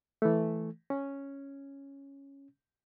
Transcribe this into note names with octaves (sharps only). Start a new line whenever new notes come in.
E3 A3
C#4